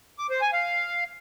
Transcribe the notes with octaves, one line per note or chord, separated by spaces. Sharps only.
D6
C5
G#5
F5